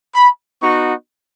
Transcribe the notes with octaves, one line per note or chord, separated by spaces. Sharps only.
B5
B3 D#4 F#4 C#6